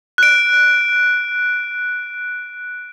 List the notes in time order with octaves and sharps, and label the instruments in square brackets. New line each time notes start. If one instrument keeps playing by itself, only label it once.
[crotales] F#6 D7